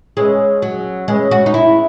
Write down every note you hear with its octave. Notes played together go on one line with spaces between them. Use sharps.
G#3 C#4 G#4 B4 E5
F#3
G#3 C#4 G#4 B4 E5
F#4
D#4
E4